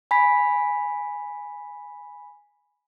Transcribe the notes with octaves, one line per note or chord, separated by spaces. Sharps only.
G#5 B5 B6